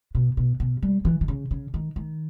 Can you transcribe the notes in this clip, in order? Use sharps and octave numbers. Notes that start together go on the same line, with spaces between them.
B2
B2
B2
G3
E3
D#3
C#3
C#3
D#3
D#3